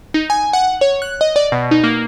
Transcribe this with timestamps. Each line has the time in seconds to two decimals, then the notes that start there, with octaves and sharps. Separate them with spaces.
0.14 D#4
0.30 G#5
0.53 F#5
0.81 C#5
1.02 F#6
1.21 D#5
1.36 D5
1.52 B2
1.71 D#4
1.84 A#3